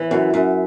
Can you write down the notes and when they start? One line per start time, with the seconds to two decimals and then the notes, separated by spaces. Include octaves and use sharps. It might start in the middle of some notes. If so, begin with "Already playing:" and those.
Already playing: E3
0.11 F#2
0.34 F#2